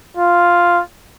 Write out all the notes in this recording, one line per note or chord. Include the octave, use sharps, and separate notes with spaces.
F4